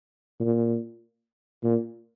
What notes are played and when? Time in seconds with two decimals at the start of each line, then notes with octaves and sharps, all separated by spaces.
0.40 A#2
1.63 A#2